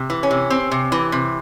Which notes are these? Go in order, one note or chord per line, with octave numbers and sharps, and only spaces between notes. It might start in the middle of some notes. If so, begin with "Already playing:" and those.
Already playing: C3
E3
C#4
C3
C4
C3
E3
C3